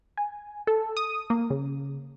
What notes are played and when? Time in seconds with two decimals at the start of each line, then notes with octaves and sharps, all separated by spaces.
0.17 G#5
0.67 A4
0.97 D#6
1.30 A#3
1.50 C#3